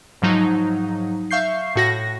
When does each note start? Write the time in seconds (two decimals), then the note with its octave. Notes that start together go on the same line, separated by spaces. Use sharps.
0.22 G#2 F3 F#3 D#4
1.31 E5 F5 C#6 G6 C7
1.76 A2 F#4 A#6